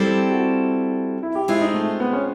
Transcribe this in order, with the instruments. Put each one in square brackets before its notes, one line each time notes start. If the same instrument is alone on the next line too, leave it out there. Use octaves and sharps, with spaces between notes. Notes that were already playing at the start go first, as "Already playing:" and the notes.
Already playing: [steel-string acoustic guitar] G3 C4 E4 A4 D5 [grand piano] G4
[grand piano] F#4
E4
G4
[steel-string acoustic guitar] G#3 C4 F4 [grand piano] E4
[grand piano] D#4
A3
B3
C#4